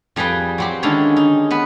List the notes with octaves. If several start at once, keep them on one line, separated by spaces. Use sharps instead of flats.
F2 G3 G#4 B4 G5
F#3 C4 G4
D3 D#3 G#3 C#4 D4 E4
D#4
B3 B4